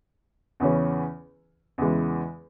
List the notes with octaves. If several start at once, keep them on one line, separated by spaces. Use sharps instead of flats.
E2 C#3 E3 C#4
E2 C#3 E3 G#3